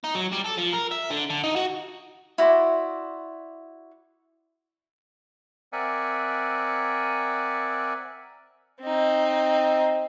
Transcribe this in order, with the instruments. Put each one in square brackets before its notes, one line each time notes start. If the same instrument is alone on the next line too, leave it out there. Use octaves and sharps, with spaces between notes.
[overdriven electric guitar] D#4
F#3
G3
A4
F3
A#4
E5
D3
D3
D#4
F#4
[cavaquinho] E4 F#4 D5 C6
[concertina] C4 A#4 D5 E5 F#5 G#5
[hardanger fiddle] C4 D#4